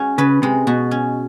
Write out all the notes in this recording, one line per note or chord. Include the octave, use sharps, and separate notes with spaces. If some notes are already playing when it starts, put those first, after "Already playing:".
Already playing: G#3 C#4 F#4
C#3 B4
C3 G#3
B2 F#4
C#4